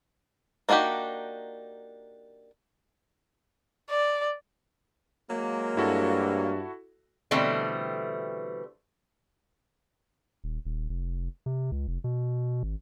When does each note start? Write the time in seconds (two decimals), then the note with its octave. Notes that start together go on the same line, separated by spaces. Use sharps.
0.69 A#3 D4 D#4 F#4 G4
3.90 D5
5.29 F#3 G#3 A#3
5.77 G2 E4 F#4 A4
7.31 B2 D3 E3 G3 A3 C4
10.44 D#1
10.65 D#1
10.89 F1
11.46 C3
11.72 C#2
11.88 F1
12.04 B2
12.63 G#1